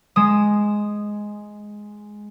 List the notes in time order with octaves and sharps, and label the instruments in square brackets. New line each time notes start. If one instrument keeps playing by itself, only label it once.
[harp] G#3 E7 [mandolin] D#6